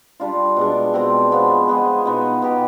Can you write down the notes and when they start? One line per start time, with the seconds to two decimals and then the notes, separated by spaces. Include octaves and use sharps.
0.20 G3 D4 F4
0.56 B2 G#3 D4
0.94 B2 G#3 C4
1.31 F3 B3 F4
1.68 G#3 B3 F4 G#4
2.05 B2 B3 D#4
2.42 B2 B3 D#4 G4